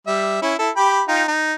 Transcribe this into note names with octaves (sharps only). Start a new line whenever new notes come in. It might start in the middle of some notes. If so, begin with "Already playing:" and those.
G3 E5
C#4 E4
E4 A4
G4 G5 B5
D#4 F4 G5
D#4